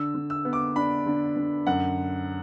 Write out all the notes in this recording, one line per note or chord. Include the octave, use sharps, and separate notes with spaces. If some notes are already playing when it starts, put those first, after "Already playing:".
Already playing: D3 E6
D3
E6
B3
D6
D4 B5
D3
D3
F#2 F#5